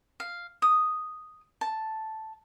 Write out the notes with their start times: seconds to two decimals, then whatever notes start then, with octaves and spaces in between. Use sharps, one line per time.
0.20 F5
0.62 D#6
1.61 A5